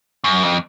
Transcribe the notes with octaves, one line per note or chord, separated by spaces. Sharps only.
F#2
F2